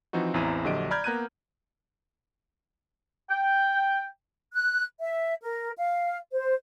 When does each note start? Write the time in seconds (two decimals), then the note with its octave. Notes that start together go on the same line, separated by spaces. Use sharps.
0.13 E3 F3 C4 D#4 F#4
0.34 A1 E2 C4 E4 A#5 D#7
0.64 A#1 D3 F#3 G4 D#5 D7
0.91 D5 A#5 B5 F6 G6 G#6
1.04 A#3 B3 A#5 F#6 G#6 D#7
3.30 G5
4.53 F#6
5.01 E5
5.41 A#4
5.77 F5
6.31 C5